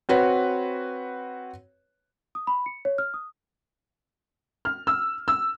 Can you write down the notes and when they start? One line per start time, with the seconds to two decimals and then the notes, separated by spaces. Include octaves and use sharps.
0.09 C4 F#4 B4 C#5
2.35 D#6
2.47 B5
2.66 C#7
2.85 C#5
2.98 F6
3.14 D#6
4.65 F6
4.87 E6
5.28 E6